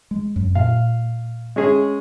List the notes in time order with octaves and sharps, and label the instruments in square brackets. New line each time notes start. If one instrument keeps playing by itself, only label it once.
[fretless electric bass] G#3
F#2
[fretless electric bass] A#2 [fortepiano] F5
[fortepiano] G#3 C#4 G#4